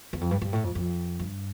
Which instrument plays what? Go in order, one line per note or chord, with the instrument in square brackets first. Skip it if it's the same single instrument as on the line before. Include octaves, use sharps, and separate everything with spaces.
[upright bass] E2
F2
G2
G2
A2
F2
F2
G2